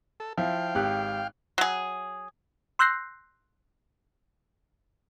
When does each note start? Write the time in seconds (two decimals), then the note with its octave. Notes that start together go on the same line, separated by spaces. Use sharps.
0.20 A4
0.37 F3 E4 F5 G5
0.75 G#1 G4 F#6
1.58 F#3 G#4
2.79 C6 E6 F#6 G6 A#6 C7